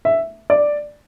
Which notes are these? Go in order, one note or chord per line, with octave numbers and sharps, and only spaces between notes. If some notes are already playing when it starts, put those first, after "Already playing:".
E5
D5